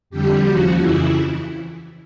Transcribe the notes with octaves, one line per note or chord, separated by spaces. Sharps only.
F2 D3 G3 G4
D#2 C#3 F3 F#4
F2 C#3 E3 E4